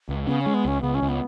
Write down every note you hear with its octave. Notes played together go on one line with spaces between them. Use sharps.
C#2
C#3 B3
C#4
G#3
B3
C#2 C#4
C#2 B3
C#4
C#2
B3